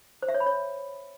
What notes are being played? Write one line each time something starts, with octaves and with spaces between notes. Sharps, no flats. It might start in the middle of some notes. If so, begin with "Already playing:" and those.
C5
E5
C#5
B5
C#5